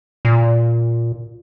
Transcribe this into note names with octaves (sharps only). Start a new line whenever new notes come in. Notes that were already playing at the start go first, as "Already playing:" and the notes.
A#2